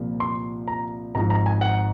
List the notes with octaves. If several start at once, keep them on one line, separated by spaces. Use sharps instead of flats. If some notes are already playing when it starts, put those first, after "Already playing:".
Already playing: C2 A#2 F3
C6
A#5
G#1 G#2 F3 A#5
A#5
G#5
F#5